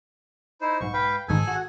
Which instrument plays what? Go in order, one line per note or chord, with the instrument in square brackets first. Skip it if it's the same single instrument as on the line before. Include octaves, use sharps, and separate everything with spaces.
[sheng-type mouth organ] D#4 E4 C5
[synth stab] B1 G#2 [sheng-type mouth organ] C#6
[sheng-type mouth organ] B4 F5 G5
[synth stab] A1 G#2 D#3 [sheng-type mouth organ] G#4 A4 G#5
[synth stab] F#4 F#5